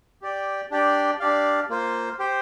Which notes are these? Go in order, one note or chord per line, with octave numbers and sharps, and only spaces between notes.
G4 D5 G5
D4 G4 D5 G5
D4 G4 D5 F5
A#3 F4 C5
G4 C5 G5